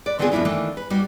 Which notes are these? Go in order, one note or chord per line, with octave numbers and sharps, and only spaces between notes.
B4 D5
D3 D#3 B3 C4 F4 G#4
F2 B2 D4 E4 F4
D#3 E3 A3 A#3 D4
B4
G3 A#3 D#4 F#4 G4